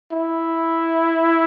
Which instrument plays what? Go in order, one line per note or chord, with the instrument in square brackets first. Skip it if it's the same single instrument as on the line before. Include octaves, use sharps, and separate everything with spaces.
[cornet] E4